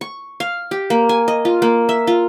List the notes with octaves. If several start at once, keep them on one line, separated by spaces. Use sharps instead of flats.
C#6
F5
G4
A#3
G#5
D#5
F4
A#3
E5
F4